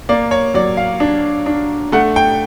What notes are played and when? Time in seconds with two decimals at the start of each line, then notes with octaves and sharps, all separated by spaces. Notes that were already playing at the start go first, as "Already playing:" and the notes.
0.09 A#3 D5
0.31 C#5
0.54 F#3 D5
0.77 F5
1.00 D4
1.46 D4
1.92 A3 F#5
2.16 G5